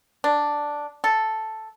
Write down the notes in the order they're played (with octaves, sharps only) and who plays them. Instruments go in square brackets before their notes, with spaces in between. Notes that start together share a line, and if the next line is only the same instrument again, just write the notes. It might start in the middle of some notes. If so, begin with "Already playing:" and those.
[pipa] D4
A4